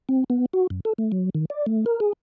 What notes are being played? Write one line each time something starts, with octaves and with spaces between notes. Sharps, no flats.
C4
B3
F#4
F#2
A4
A3
F#3
D#3
D5
A3
A#4
G#4